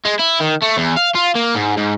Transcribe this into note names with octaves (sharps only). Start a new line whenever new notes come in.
G#3
E4
D#3
A3
E2
F5
F4
A#3
G#2
G#2